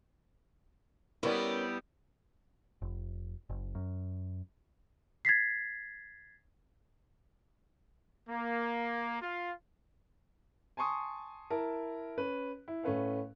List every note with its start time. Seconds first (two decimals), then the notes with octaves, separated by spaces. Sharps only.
1.23 G3 B3 C#4 E4 A#4 D5
2.82 F1
3.50 F#1
3.75 F#2
5.25 G#6 A6 B6 C7
8.28 A#3
9.21 F4
10.77 G#5 A5 C6 C#6 D#6
11.50 E4 A#4 A5
12.18 C#4 B4
12.68 E4
12.83 A2 A3 C#4 B4 C#5 F5